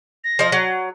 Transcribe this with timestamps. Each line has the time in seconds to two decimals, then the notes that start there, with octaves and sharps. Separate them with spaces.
0.24 A#6
0.39 F3 D#5
0.52 F#3